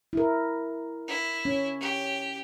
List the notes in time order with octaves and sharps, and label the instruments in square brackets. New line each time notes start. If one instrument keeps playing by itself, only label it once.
[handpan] E4 A#4
[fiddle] E4
[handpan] C#4
[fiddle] G4